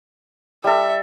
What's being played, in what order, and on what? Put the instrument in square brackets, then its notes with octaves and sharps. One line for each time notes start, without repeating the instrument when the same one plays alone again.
[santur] G3 A4 [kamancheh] E5